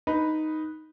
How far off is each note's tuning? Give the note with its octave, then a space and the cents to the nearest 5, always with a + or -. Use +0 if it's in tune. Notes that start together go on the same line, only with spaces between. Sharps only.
D#4 +0 B4 +0